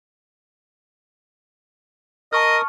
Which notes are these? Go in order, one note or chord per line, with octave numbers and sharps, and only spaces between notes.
A#4 D#5 A5 C#6 D#6 F6